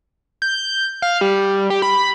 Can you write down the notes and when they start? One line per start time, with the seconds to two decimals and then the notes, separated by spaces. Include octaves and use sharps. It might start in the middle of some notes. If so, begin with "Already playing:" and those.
0.42 G6
1.02 F5
1.21 G3
1.70 G4
1.82 B5